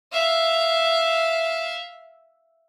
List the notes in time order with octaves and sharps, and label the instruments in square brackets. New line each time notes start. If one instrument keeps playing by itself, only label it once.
[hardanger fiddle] E5 F5